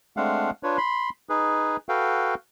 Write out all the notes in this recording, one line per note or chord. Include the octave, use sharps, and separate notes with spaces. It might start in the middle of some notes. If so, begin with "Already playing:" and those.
G#3 A3 C4 D4 F5 F#5
D4 F4 B4 C#5
B5 C6
D#4 G#4 B4
F#4 A4 B4 F5 G5